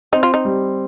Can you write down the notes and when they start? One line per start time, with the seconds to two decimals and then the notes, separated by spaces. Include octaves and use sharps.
0.12 C4 D#4
0.23 F4
0.34 D#4
0.45 G3